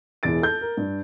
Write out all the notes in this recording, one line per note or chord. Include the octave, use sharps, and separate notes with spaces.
E1 E2 G#4 A6 D7
A4 G6
A#4
G2